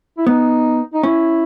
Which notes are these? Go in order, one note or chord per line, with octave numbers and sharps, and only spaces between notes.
E4
B3 D#4
D#4
C#4 E4